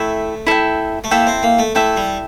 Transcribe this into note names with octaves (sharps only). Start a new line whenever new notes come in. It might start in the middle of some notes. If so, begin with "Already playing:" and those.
Already playing: A3 E4 A4 E5 G5
E4 A4 E5 G5
A3
A#3 E4 A4 E5 G5
C4
A#3
A3
A3 E4 A4 E5 G5
G3